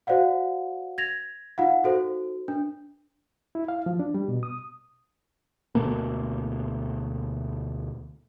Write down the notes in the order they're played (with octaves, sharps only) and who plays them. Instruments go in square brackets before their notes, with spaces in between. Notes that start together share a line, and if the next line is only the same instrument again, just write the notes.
[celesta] F#4 C5 D5 F5 F#5
G#6 A#6 F7
D#4 F4 F5 F#5
D#4 F#4 A4 C5
D4
[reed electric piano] E4
F5
F3
D4
G3
B2
D#6
[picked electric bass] D2 B2 A3 A#3